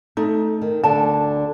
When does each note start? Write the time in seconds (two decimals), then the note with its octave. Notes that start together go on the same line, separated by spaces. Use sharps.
0.17 A3 D#4
0.62 D#3
0.84 D2 D3 A5